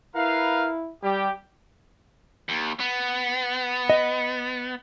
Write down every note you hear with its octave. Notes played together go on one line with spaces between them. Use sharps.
E4 A#4 B4 F5
G3 G4
D#2
B3
D#5